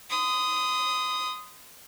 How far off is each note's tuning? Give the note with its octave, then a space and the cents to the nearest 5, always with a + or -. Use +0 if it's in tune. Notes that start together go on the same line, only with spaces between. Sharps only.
C6 -40 D#6 +0